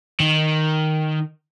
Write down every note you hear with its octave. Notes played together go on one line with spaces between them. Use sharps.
D#3